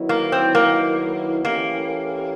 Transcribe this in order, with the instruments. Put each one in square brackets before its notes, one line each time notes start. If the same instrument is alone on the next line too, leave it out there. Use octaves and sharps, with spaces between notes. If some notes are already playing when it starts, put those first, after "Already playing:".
Already playing: [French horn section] D#3 F#3 B3 E4
[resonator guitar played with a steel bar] A#3
C4
A#3
[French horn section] E3 A3 C#4 E4 G4 [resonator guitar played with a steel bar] A#3